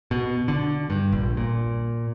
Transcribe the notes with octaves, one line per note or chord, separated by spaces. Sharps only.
B2
D3
G2
A#1
A#2